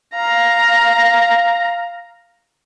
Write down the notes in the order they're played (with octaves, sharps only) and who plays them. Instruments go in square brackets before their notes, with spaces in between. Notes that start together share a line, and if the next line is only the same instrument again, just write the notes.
[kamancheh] F5 A#5